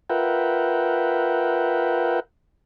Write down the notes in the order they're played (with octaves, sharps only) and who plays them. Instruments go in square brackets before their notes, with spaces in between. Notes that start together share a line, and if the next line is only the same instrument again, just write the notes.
[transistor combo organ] F4 A#4 B4 E5 F#5 G5